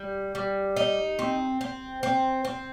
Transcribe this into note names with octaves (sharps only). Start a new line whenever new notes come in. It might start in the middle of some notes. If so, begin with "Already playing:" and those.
Already playing: G3
G3
D#4
C4
C4
C4
C4